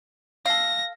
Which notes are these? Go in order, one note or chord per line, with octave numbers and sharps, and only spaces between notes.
A4 F5 A#6